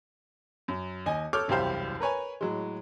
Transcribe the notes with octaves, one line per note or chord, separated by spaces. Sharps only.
F#2
D#2 D#5 G#5
A4 C#5 D6 F6 G6
E1 C2 F#2 G4 C5 F5
A#4 B4 C#5 G#5
A2 F#3 G#3